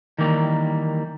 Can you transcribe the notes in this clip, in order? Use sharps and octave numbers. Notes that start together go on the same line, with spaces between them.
D#3 E3 G3 A#3